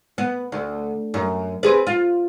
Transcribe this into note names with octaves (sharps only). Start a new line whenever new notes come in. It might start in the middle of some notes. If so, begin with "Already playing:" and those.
B3
D2
F#2
C4 G#4 B4
F4